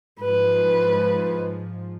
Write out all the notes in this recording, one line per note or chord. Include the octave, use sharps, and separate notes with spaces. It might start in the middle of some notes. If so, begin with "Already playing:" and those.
G#2 F3 B4